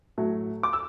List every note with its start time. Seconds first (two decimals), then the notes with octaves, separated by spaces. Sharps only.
0.18 A2 F#3 A3
0.63 D6
0.73 E6